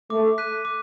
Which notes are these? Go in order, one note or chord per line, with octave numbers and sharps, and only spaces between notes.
A3 D6
F#6 B6 D#7
D6